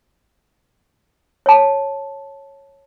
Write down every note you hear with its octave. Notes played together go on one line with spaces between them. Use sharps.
C#5 A5